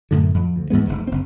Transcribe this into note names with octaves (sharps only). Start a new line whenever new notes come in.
F#2 A2 D3
F2
D2
E2 G#2 G#3 B3
F1 G#2
F#1 C4